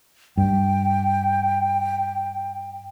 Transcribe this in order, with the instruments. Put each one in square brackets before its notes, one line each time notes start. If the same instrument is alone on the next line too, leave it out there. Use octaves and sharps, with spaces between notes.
[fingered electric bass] G2 [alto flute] G5